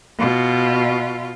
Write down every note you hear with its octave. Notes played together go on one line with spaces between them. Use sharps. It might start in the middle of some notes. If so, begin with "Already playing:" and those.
B2 F4